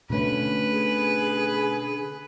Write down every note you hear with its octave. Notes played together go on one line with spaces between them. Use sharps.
B2 D3 A3 C#4 B4
G#4